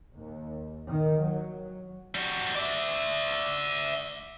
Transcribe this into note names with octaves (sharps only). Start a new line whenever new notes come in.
D#2
D#3
F#3
G3 F#4
D5 E5